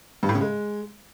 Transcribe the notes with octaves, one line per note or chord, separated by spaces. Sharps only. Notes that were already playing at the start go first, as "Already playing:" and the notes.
G2
A2
C#3
G#3